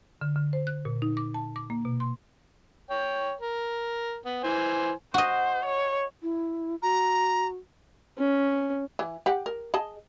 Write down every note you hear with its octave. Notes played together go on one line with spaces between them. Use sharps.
D3
D3
C5
F#6
A#2
D#4
D6
A5
D6
A#3
B2
C6
C#5 G5
A#4
B3
E3 C5 G#5
F#4 C5 D#5
C#5
E4
F#4 A#5
C#4
E3
G4 F#5
A#4
G#4 D#5 A5